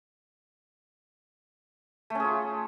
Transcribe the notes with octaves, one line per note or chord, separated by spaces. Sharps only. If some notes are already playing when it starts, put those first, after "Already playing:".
A3 C#4 F4 G#4